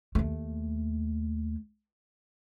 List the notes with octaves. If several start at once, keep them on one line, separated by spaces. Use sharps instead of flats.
D#2 A3